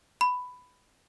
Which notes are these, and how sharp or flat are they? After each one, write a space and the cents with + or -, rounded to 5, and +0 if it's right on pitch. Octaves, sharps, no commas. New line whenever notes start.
B5 +10